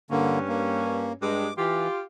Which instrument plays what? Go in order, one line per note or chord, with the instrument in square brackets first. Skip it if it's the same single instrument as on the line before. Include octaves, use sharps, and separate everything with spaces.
[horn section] G2 C#4 [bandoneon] D3 A#3
[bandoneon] A#3
[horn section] G2 G#3 [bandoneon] D6
[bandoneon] E3 [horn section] F4 G4